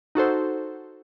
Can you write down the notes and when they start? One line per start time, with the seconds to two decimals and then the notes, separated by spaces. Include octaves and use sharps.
0.15 D#4 F#4 A4 C5